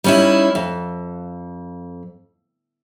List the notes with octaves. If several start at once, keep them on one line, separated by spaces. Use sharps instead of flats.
G3 B3 C#4 D#4 E4
F2